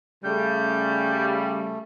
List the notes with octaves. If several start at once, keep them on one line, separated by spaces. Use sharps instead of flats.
C#3 G3 A3 G6